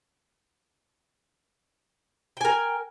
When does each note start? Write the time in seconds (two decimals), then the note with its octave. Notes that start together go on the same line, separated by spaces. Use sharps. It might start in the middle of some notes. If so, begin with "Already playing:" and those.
2.37 G5
2.41 G#5
2.45 A#4